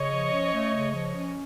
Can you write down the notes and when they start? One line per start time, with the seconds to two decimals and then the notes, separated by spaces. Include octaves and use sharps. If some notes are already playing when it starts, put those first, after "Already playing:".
Already playing: C#3 C#5 D#5
0.11 F3
0.32 C#4
0.52 A3
0.73 C#3
0.94 F3
1.15 C#4